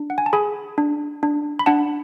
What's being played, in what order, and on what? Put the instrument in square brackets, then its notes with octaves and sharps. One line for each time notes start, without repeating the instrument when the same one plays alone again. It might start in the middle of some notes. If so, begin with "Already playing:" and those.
Already playing: [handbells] D4
F#5
G#5
A5
G#4 G#5 B5
D4
D4
B5
D4 F#5 A5